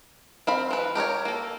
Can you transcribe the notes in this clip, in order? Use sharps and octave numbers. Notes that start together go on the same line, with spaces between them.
C4 F5 B5
E3 B4
G4 A#4 B4 C#5
A#3 A4